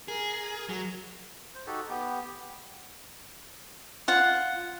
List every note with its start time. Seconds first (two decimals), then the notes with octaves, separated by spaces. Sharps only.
0.08 G#4 A#4
0.69 F#3
1.54 C5
1.66 D#4 F#4 G4 A4
1.90 B3 G4
4.08 F4 F#5